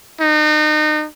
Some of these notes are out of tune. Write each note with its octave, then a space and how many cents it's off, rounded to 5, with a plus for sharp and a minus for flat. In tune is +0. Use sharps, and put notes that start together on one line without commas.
D#4 -35